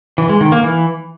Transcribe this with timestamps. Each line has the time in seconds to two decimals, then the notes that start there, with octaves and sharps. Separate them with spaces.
0.18 E3
0.29 G#3
0.41 D#3
0.52 A#3
0.63 E3